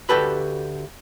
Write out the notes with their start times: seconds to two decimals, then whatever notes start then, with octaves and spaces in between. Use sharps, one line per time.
0.09 D2 F#4 G4 A4 B4 B5